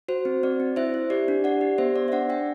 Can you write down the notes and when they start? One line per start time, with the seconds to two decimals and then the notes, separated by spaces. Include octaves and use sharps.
0.08 F#4 C5
0.25 C4
0.43 C4 D5
0.60 C4
0.76 E4 C5 E5
0.94 E4
1.10 G4 D5
1.28 D4
1.44 G4 D5 F#5
1.61 G4
1.78 B3 C5 E5
1.96 B3 D5
2.08 E5
2.12 D4 D5 F#5
2.29 D4 E5 G5